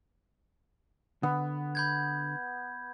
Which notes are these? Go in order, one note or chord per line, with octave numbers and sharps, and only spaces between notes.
D3 B3
B5 G6 G#6